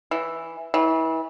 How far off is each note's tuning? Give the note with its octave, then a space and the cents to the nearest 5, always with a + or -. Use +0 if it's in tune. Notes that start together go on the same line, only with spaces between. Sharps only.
E3 +0
E3 -30